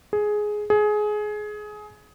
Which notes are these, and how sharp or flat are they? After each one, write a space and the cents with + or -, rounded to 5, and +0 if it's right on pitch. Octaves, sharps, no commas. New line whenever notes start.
G#4 +10
G#4 +20